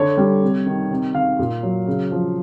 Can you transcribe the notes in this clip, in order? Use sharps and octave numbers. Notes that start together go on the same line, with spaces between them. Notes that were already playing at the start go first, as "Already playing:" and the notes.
Already playing: D3 C#5
G3
C3
D#3
C3
D#3 F5
A#2
F#3
C#3
F3